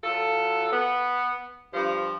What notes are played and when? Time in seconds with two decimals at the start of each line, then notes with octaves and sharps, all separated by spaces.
0.04 F#3 F4 A4
0.73 B3
1.73 G2 F3